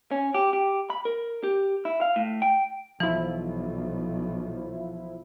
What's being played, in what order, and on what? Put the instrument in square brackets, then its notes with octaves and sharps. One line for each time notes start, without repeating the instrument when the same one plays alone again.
[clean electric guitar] C#4
G4
G4
B5
A#4
G4
E4
F5
A2
G5
[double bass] B1 [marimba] E3 [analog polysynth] F3 E4